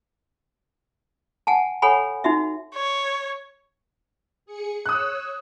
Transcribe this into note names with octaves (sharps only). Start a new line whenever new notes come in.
F#5 G#5 A5
A4 C#5 F#5 G#5 B5
D#4 F#4 E5
C#5
G#4 C#7
C#5 D#6 E6 F#6